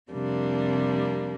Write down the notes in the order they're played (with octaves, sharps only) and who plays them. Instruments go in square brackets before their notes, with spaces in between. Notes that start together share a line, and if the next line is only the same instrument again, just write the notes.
[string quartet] F2 C3 G3 A#3 D4